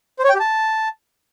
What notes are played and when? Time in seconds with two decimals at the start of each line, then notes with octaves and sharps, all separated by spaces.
0.19 C5
0.24 C#5
0.29 G5
0.35 G4
0.40 A5